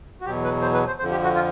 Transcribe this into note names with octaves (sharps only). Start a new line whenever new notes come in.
F#4
E2 B2 F#3 G4
B4
C5
B4
C5
F2 D3 F3 C5
G4
F#4
F4